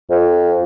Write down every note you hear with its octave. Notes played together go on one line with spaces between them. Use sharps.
F2